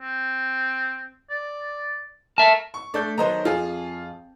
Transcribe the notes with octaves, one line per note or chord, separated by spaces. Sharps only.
C4
D5
A#4 E5 A5
C#6
A3 D4 A4 D5 G6
D#3 F#3 B3 C5 D#5 A#5
F2 F4 G#4